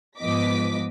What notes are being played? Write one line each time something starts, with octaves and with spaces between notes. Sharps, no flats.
G#2 F3 B3 D#5 D6 B6